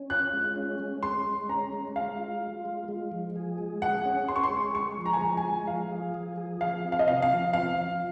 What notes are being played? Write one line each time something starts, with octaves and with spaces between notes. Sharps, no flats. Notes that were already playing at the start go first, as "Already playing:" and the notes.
Already playing: C#4
F4 F#6
G#3
C#4
G#3
G#3 C6
G#3
C#4 A#5
G#3
G#3 F5
F4
F4
G#3
G#3
F3
G#4
G#3
G#4 F#5
C#4
G#4 C6
C#6
C6
G#3
G#3 C#6
F3
A#5
G#5
G#3 A#5
G#5
G#3
F3 F5
G#4
F3
G#4
F3 F5
C4
F5
D#5
C3 F5
F5
F3
C4 F5
F3